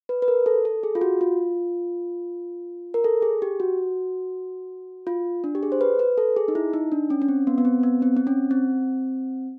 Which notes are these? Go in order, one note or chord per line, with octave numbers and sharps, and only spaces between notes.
B4
B4
A#4
A4
A4
G#4
F4
F#4
F4
A#4
A4
G#4
G4
F#4
F4
D4
G4
G#4
C5
B4
B4
A4
G#4
D#4
E4
D#4
D4
C#4
C#4
C4
B3
B3
C4
B3
C4
C4
C#4
C4